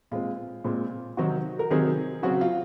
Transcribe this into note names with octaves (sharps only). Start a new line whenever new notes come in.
A#2 G#3 C4 F4
A#2 G#3 C4
C3 D#3 F#3 C4 F#4
A#4
C3 D#3 F#3 C4 G#4
C#3 F#3 C4 F#4
F4